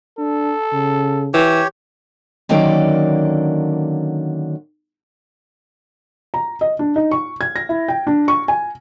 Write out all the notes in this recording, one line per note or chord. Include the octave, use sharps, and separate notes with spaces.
D4 A4
C#3
E3 G4 C#5
D3 D#3 F#3 A#3 C#4 D5
A#5
D#5
D4
D#4
C#6
G#6
A#6
E4
G5
D4
C#6
G#5